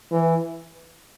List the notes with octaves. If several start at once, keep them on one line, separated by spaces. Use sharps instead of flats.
E3